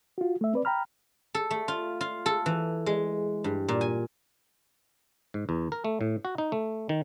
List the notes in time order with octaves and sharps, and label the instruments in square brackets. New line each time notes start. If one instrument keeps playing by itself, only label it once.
[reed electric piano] F4 F#4
A3 E5
C4 B4 D5
G5 A#5 B5 F6
[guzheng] A4
A3
F4
F4
A4
E3
G#3
G2
A#2
G#5
[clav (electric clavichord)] G#2
E2
A#4
A3
A2
F#4
D#4
A3
D#3